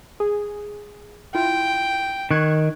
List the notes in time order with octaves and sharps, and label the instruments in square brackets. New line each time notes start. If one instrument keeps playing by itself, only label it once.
[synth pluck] G#4
[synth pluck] E4 F4 [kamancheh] G5
[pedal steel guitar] D#3 [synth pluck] C#6 F#6 G#6